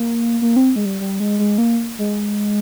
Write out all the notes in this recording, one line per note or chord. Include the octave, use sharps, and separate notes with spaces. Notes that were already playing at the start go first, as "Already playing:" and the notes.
Already playing: A#3
A#3
C4
G#3
G3
G3
G#3
G#3
A#3
G#3